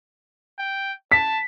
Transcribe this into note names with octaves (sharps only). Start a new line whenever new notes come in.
G5
A5 B6